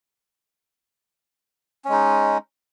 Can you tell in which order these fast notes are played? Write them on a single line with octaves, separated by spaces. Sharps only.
C#4 G#3 D#4